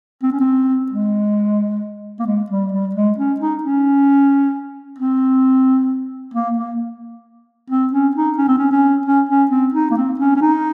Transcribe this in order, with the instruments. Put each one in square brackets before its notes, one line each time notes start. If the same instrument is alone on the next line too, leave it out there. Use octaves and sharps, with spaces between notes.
[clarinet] C4
C#4
C4
G#3
A#3
G#3
G3
G3
G#3
C#4
D#4
C#4
C4
A#3
A#3
C4
C#4
D#4
C#4
C4
C#4
C#4
C#4
C#4
C4
D#4
A#3
C4
C#4
C#4
D#4